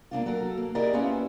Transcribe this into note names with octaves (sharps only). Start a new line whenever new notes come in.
A#3 C4 D4 F4
F#3 A4 A#4
A#3
E4 G4 G#4 A#4 D5 D#5
A#3 B3 C#4 E4 F4 G4